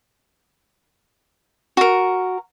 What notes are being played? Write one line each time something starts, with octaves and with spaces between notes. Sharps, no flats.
F#4 A#4